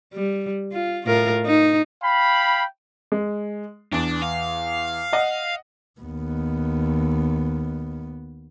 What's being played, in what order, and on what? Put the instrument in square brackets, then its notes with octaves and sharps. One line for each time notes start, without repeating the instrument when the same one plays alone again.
[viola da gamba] G3
F4
A2 F4 A#4
D#4
[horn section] F5 G5 B5
[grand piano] G#3
[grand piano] E2 [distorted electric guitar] D4
[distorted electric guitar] F5
[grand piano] D#5 F#5
[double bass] D#2 B3